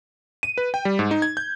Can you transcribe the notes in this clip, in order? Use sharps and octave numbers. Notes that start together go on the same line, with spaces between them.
D#7
B4
G5
G3
G#2
D#4
G#6
G6